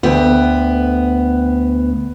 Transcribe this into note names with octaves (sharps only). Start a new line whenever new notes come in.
D2 B3 G5